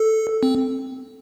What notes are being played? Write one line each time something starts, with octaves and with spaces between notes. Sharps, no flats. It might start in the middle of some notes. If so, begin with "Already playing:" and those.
Already playing: A4
C4